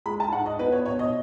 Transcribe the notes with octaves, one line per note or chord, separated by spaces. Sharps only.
G#3 B5
A5
G#2 F#5
D#5
B3 B4
C#5
B2 C#5
D#5